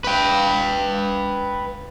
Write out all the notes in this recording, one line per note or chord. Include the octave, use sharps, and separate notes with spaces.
B4 G5